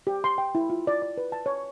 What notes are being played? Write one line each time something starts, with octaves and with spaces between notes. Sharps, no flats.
G4
C6
G5
E4
F4
D5
D5
B4
A5
C#5